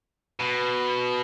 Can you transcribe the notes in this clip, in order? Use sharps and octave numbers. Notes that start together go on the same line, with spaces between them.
B2